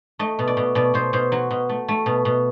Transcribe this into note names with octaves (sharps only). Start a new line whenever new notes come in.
A3 D#5
B2
D5
B2
B2 D5
B2 C5
B2 C5
F#3
B2
A3
A3
B2
B2